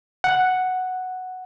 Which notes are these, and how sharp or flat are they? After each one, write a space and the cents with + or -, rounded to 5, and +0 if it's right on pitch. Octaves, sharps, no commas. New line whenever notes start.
F#5 +0